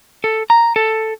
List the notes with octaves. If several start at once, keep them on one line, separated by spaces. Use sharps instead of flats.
A4
A#5
A4